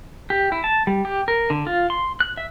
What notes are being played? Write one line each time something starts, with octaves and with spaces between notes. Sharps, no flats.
G4
E4
A5
G3
G4
A#4
D3
F4
C6
F#6
E5